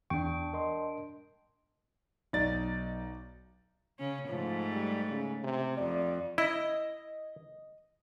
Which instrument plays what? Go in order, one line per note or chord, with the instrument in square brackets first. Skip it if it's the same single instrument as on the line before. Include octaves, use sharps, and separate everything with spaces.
[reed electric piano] E2 C#6 [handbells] D4 G5
[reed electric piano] A#4 D#5 C6
[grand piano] B1 A6 [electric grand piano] D#4 D5
[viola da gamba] C#3 C#4
[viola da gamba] G#2 A3 [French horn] F3
[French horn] G3
C#3
C3
[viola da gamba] F2 [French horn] D5
[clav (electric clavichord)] E4 [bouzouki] D#5